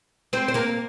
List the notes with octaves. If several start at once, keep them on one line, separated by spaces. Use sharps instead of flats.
C4 C5
C5
A#3 A#4